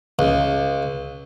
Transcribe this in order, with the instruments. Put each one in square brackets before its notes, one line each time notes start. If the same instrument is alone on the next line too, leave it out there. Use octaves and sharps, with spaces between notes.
[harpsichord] C#2